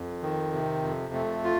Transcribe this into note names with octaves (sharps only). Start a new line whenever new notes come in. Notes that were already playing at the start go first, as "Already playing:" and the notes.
Already playing: F2
D#3
C3
F2
A3
F4